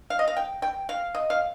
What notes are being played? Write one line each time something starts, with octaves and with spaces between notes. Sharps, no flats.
F5
D#5
F5
G5
G5
F5
D#5
F5